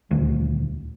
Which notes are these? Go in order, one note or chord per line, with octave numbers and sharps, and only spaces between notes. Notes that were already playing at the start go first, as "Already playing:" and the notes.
D#1 D2